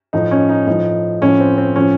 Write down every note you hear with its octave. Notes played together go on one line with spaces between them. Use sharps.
A2 F3 D#4
C#4
D#4
A2 F3 D#4
A2 F3 C#4
C4
C4
A2 F3 C#4